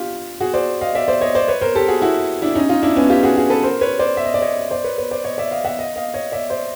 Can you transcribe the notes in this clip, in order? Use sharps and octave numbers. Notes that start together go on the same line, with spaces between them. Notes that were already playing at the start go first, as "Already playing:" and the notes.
Already playing: D4 F4 G4
F#4 G#4
C5 D5
D#5 F5
D5 E5
C5 D5
C#5 D#5
C5 D5
B4 C#5
A#4 C5
G4 A4
F#4 G#4
E4 F#4
D4 E4
C#4 D#4
D#4 F4
D4 E4
B3 C#4
F4 G4
F#4 G#4
F#4 G#4
A4 B4
A#4 C5
B4 C#5
C5 D5
E5
D#5
D5
C#5 D#5
C5 D5
B4 C#5
B4 C#5
C5 D5
C#5 D#5
D5 E5
D#5 F5
E5 F#5
D#5 F5
D#5 F5
C#5 D#5
D5 E5
C5 D5